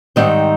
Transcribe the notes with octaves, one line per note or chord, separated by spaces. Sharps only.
G#2 D#3 G3 C4 D#4 C5 D#5